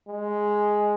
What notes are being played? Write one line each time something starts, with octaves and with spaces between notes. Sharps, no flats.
G#3